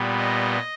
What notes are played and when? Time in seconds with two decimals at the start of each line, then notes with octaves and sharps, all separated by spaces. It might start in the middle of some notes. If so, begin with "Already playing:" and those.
Already playing: A#2 G3 B3
0.17 D#5